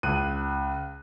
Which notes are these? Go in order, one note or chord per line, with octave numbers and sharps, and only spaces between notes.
C#2 F#6 D#7